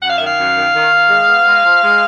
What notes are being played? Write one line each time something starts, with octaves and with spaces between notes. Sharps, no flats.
F#2 F#5
F5
D#3 E5
F5
F#2
D#3
D#3
D#3
G#3
B3
G#3
F3
G#3